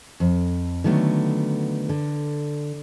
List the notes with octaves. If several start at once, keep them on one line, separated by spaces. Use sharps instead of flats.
F2
D3 D#3 F#3 A3 B3
D3